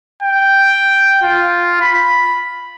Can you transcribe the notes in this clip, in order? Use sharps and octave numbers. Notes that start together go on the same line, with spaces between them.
G5
F4
B5